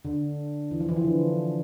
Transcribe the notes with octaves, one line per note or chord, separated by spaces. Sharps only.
D3
E3
F3
E3
F3
D3